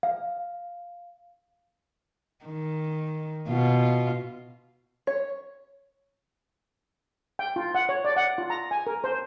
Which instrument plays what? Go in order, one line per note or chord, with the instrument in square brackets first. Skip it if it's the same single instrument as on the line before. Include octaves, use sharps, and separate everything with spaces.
[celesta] F5
[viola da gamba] D#3
B2 F4
[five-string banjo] C#5
[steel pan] G5
F4
F#5
C#5
D5
F#5
F4
A#5
G#5
A#4
C5